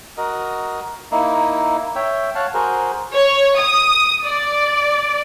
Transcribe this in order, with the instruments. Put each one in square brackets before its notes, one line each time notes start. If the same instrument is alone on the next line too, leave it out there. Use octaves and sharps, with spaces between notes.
[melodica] F#4 A#4 D#5
A#3 D#4 E4
C#5 E5 G5
C#5 F5 F#5 A5
F#4 G#4 A#4 C5
[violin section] C#5
D#6
D5